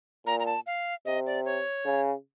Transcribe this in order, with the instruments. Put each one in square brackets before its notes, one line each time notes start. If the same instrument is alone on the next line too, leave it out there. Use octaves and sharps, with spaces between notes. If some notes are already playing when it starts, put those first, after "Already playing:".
[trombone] A#2 [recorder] A#5
[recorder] A#5
A5
F5
[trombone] C3 [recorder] D#5
[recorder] D5
C#5
[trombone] C#3